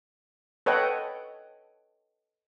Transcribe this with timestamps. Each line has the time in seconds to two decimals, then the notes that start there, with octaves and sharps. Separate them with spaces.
0.66 A4 B4 C#5 D#5 F#5 G5